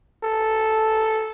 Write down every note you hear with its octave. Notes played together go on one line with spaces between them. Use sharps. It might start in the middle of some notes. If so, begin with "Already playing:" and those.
A4